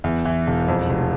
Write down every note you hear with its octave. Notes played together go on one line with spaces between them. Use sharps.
E2
E3
E1
F2
F1